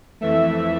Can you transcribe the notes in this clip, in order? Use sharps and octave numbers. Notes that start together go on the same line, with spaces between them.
F2 E3 A3 E5